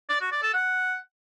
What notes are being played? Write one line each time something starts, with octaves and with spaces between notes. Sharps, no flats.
D5
F#4
D5
A4
F#5